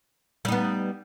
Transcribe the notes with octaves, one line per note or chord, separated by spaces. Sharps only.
G3 B3 D#4